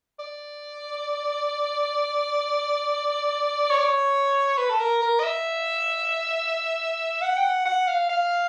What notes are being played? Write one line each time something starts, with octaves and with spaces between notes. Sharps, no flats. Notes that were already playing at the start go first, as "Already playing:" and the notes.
D5
C#5
D5
C#5
B4
A4
A#4
A#4
D#5
E5
F#5
G5
F#5
F#5
F5
F5